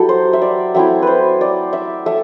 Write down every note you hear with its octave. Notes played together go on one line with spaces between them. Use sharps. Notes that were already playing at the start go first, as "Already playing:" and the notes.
Already playing: F#3 E4 G4 A4
C5
E5
D5
F#3 A3 C4 E4 E5
B4 C5
D5
E5
A3 E5